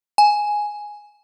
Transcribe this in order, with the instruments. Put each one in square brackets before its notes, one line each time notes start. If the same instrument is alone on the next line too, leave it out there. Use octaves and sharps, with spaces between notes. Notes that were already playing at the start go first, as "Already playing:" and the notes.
[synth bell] G#5